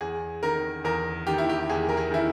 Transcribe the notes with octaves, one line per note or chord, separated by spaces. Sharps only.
E2 G#4
D#3 A#4
E2 A#4
D#3 G4
E4
G4
E2 G#4
A#4
G#4
D#3 E4